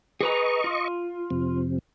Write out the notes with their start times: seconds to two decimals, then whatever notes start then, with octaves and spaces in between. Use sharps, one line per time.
0.21 G#4 B4 D#5 A#5 C#6
0.64 F4
1.30 F2 C3